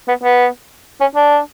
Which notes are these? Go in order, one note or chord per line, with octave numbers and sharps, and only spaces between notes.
B3
B3
C#4
D4